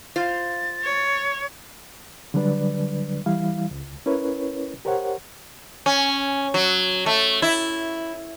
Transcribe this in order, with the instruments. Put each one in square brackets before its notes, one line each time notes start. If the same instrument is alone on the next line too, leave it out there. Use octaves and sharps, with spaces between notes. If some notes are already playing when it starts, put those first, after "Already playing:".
[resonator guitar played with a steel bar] F4 C5 F5 [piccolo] A6
[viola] C#5
[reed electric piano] D3 F#3 G3 D4 B4 D5
E3 G3 E4 F5
C#2
C#4 E4 A#4 B4 C#5
G4 A#4 C5 C#5 F#5
[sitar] C#4
F#3
A3
E4